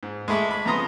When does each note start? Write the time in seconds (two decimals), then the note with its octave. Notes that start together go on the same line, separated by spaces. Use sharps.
0.03 G#2
0.28 G#3 A3 B5 D6
0.51 B5
0.66 F2 C#3 B3 A#5 C6 D#6